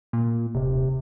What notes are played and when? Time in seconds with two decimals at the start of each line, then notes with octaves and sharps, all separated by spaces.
0.13 A#2
0.55 D#1 C3